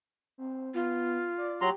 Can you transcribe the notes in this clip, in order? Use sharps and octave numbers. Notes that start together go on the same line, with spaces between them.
C4
B3 F4
D5
F#3 G4 A#5 C6